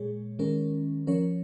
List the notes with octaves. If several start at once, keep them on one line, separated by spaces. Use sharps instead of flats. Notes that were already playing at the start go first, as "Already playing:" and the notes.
Already playing: A#2 G#3 G#4 C#5
D#3 G#3 C#4 A#4
F3 C#4 A#4 C#5